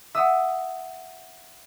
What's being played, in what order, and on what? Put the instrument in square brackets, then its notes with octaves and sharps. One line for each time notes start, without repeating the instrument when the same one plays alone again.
[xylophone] E5 F#5 [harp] D#6 E6